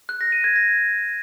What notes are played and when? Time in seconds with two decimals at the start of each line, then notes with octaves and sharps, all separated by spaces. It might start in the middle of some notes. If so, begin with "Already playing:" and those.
0.09 F#6
0.21 A#6
0.32 D#7
0.44 G#6
0.56 A#6